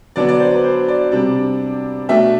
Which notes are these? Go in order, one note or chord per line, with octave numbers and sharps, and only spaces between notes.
D3 F#3 B3 D4 D5
D5
C5
B4
C5
D5
C3 G3 D4
B2 A3 D4 E5